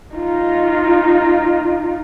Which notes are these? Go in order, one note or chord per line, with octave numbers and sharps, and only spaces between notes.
D#4 F4